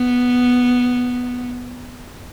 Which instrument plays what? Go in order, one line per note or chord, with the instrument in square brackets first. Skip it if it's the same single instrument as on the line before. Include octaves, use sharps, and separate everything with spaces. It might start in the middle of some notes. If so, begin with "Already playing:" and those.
Already playing: [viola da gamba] B3